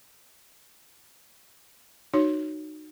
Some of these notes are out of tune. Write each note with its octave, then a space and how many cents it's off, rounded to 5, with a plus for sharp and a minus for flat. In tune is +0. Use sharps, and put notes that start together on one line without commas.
D#4 -25 F#4 +0 C#5 +0